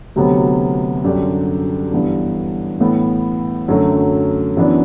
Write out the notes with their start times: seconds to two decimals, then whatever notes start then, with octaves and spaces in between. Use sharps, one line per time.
0.16 D2 C3 F#3 B3
1.04 F#2 D3 G3 D4 G4
1.92 G2 E3 B3 D4
2.80 A2 E3 B3
3.68 F#2 D3 F#3 A3
4.57 F#2 E3 B3 D4